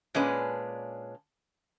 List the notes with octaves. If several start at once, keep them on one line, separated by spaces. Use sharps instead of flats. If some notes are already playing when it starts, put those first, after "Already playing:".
A#2 G#3 C#4 D4 B4